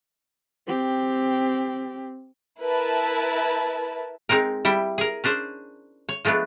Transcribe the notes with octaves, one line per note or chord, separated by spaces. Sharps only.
C4 G4
E4 A#4 B4 E5 A5
G#3 C4 D#4 A#4
G3 E4 G5
G#4 A#4
C#4 D4 G#4 C5
C#5
F3 G#3 A3 B3 D4